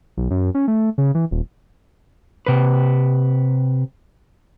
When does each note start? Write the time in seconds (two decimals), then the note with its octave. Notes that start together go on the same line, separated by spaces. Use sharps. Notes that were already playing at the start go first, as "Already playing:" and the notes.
0.17 B1
0.31 F#2
0.55 C#4
0.68 A3
0.98 C#3
1.15 E3
1.31 D#1
2.47 C3 B4